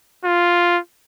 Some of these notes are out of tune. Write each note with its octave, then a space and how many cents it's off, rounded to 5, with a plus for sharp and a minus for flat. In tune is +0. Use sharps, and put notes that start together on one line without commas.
F4 +0